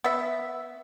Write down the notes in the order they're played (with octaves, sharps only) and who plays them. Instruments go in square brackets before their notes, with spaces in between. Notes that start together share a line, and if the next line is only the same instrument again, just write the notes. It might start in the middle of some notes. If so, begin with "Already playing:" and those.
[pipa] B3 E5